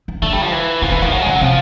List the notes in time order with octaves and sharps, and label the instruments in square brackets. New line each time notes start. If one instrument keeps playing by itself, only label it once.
[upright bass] E3
[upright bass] D3 [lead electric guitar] A3
[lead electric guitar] G3
F3
E3
[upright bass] C#3 [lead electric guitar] F3
[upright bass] D3 [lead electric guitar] E3
[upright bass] D#3 [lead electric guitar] F3
[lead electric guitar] F#3
G#3
[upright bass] C#3 [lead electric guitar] F#3
[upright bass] C3 [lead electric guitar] F3